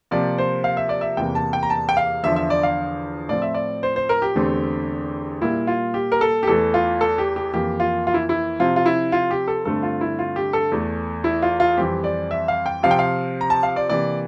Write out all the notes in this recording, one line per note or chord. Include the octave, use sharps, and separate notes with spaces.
C3 F3 A#3 D5
C5
F5
E5
D5
E5
E2 C3 E3 A#3 G5
A5
G5
A#5
A5
G5
F5
E2 D3 F3 E5
E5
D5
F5
A2 F3 C4 D5
E5
D5
C5
C5
A#4
G4
E2 D3 A3 C4
A#2 G3 A#3 E4
F4
G4
A#4
A4
G4
E2 E3 A3 A4
F4
A4
G4
G4
F2 E3 A#3 G4
F4
F4
E4
E4
C3 F3 C4 F4
F4
E4
F4
G4
A4
G2 D3 A3 C4 A4
F4
E4
F4
G4
A4
E2 E3 A3
E4
F4
F4
F2 E3 G3 C4 G4
D5
E5
F5
G5
C3 F3 C4 F5
G5
F5
A#5
A5
F5
D5
C3 E3 A#3 D5